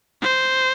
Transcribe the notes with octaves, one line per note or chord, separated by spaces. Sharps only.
C5